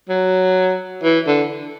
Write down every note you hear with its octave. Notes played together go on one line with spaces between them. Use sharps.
F#3
E3
D3